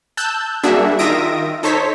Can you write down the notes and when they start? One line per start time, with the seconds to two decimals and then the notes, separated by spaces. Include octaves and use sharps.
0.17 A5 E6 F#6 G6
0.63 G3 A#3 D4 F#4 G#4 E5
0.99 D#3 F4 E5 D#6 A#6 D7
1.63 D#4 A4 C5 C#5 B6